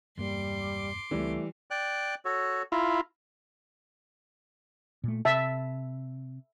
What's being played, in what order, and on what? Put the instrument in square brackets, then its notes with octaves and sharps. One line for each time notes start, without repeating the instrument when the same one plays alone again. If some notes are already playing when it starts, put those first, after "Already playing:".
[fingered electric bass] E1 G2 A#3 [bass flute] G3 [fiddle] C6 D6
[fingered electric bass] C#2 C4 [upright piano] E3 G3 [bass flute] A3
[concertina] D5 G5 F#6
F#4 A4 C#5
[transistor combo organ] E4 F4 [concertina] A#5
[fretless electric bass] A#2 A3
[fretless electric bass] C3 [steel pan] E5 A5